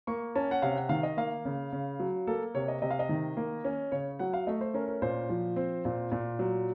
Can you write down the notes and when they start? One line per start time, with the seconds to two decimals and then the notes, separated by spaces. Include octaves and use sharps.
0.07 A#3 C#6
0.36 C#4 A5
0.51 F#5
0.62 C3 F5
0.76 F#5
0.89 D#3 F5
1.03 D#5
1.17 A#3 F5
1.45 C#3
1.72 C#3
2.00 F#3
2.27 A#3 A4
2.55 C3 C#5
2.68 D#5
2.82 C3 D#5
2.91 F5
2.99 D#5
3.09 D#3
3.37 A#3
3.65 C#4
3.92 C#3 C#5
4.19 F#3 F#5
4.33 F5
4.47 A3 D#5
4.61 C5
4.74 C#4 A#4
4.88 A#4
5.02 A#2 C5
5.29 F3
5.56 C4
5.85 A#2
6.12 A#2
6.39 F#3